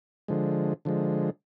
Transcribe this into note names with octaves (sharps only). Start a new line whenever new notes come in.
D3 F3 G#3
D3 F3 G#3